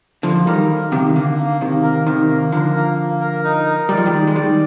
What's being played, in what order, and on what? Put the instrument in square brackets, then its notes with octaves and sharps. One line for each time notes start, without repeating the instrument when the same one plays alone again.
[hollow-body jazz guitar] D3 F3 [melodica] A#3
[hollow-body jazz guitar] D#3 G3 [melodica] A#4
[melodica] A#3
[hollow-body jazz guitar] C3 D#3 [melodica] A#3
[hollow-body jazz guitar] D3 [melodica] A#3
[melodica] A#3
[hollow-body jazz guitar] C3 D#3 [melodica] A#3
[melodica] A#4
[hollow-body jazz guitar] C3 D#3 [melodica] A#4
[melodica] A#3
[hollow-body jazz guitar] D3 F3 [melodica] A#4
[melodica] A#3
A#3
A#4
D#4
A#4
[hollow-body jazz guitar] G3 [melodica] D5
[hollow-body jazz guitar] F3
D#3 G3
[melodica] D5
[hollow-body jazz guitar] G#3
[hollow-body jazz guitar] D#3 G3 [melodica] D5